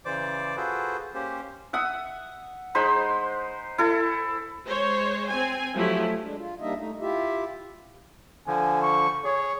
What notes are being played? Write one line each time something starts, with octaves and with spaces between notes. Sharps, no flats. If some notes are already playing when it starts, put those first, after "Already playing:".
C#3 E3 C5 D5 D6
F4 F#4 G#4 A4 B4 C5
A#3 C#4 G4 C5
E5 F#5 D#6
G#3 D#4 C5 B5
E4 A4
G#3 C5 C#5
C4 G#5
F3 F#3 A3 E4 G4
G#3 D4
F4
G3 A#3 D4 D#4 D#5 E5
A3 D#4
E4 F4 G4 E5
D3 F3 G#5
C#6
G#4 C#5